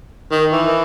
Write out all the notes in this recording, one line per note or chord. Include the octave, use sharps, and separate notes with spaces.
D#3
E3